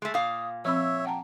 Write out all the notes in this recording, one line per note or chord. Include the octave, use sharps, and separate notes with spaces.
G#3 A3
A#2 F5 D#6
F3 C4 C#5 E5 B5 E6
F#5 G5 A5 A#5